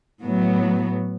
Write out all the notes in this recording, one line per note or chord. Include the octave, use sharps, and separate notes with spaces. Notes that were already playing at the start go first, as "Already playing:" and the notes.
A2 F#3 B3